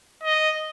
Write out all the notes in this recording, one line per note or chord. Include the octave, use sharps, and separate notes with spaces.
D#5